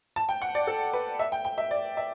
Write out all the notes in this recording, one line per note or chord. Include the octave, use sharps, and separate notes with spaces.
A5
G5
F#5
D5
A4
B4
E5
G5
G5
E5
D5
E5